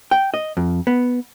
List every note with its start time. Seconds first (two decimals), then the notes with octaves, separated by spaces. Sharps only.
0.11 G5
0.34 D#5
0.57 F2
0.87 B3